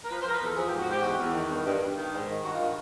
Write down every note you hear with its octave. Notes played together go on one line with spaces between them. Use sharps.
A#4
F3 B4
C5
F3 A#4
B4
E2 A4
F3 G#4
G#2 G4
F#4
G#2 G4
E2 F#4
E2
D#3
G2
G2
G2
D#3
G#2
D#3
G2 F#4
D#3 F4